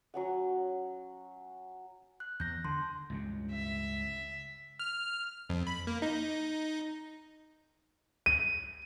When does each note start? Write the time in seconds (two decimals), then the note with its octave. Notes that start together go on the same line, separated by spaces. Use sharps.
0.14 F#3 C#4 F#5
2.20 F#6
2.40 E2 G6 A#6
2.65 D3 C6
3.10 C#2 G2 C#3
3.52 E5
4.79 F6
5.50 F2
5.67 B5
5.87 A#3
6.02 D#4
8.26 D#7